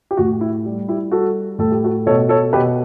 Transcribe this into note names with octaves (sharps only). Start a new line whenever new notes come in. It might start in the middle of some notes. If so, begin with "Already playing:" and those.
G4
A2 F#4
E4
G3
E4 G4
G3 F#4 A4
A2 A4
G4
F#4 A4
B2 A4 C#5
A4 C#5
B2 G4 B4